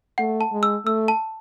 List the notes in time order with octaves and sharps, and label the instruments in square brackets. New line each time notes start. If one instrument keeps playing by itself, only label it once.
[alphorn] A3 [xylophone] F#5
[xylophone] A5
[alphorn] G#3
[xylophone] E6
[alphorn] A3 [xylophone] E6
[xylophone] A5